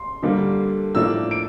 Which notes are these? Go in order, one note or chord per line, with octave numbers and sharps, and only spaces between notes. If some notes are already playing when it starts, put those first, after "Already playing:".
Already playing: C6
D3 G3 A#3 D4
A2 F3 A#3 D4 E6
D7